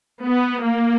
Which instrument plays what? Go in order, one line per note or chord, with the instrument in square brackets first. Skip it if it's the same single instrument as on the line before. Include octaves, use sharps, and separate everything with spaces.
[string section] B3
A#3